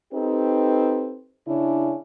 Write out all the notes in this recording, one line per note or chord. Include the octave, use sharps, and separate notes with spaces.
C4 D#4 G4 A4 B4
C#3 C#4 D4 E4